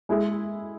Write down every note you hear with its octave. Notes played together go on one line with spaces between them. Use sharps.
G#3 E4 G#4